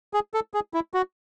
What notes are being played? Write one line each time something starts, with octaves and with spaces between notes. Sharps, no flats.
G#4
A4
G#4
E4
F#4